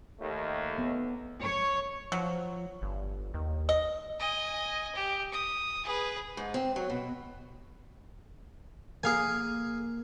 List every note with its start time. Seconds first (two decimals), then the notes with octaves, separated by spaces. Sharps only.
0.20 D#2 A3
0.78 B3
1.42 C#5
2.12 F3 F#3
2.82 G1
3.34 D#2
3.69 D#5
4.20 D#5 G#5
4.95 G4
5.32 D#6
5.84 G#4 B4
6.37 G#2
6.54 C4
6.76 F#3
6.90 B2
9.03 A#3 G#4 F5 G#5